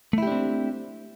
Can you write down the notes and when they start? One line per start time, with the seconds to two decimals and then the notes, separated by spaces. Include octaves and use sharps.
0.13 A3
0.18 E4
0.23 G4
0.27 D4
0.32 C4